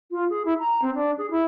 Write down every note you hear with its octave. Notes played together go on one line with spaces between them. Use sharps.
F4
G#4
E4
A#5
C4
D4
G#4
E4